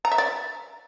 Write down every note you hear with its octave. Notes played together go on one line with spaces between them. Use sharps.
A#5
E5
D5